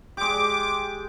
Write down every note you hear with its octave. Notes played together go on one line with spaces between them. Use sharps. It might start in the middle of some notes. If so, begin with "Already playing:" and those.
G#3 G4 D6